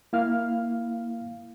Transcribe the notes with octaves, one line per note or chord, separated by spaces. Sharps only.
A#3 E4 F5 F6